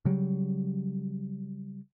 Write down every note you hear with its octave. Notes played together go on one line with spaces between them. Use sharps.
C#3 F#3 G3